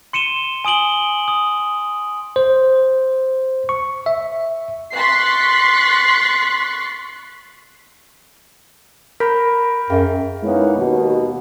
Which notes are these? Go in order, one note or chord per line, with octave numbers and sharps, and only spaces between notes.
C6 C#7 D#7 E7 G7
G#5 D#6 D7 F#7 G7
D#6
C5
C#6
E5
C6 C#6 F#6 A6 B6 C7
A#4 B5 G6 B6
F#2 G#4 F5 G5
G#3 A#3 B3 C#4 D#4 E4
D#2 B2